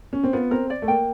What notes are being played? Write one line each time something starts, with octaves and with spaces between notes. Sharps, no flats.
C#4
C4
B3 F4
C4 A#4
D5
A3
A#3 G5